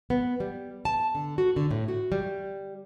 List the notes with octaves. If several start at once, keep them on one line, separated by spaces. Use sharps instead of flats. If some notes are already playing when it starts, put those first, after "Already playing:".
B3
G3
A5
D3
F#4
D3
A2
F#4
G3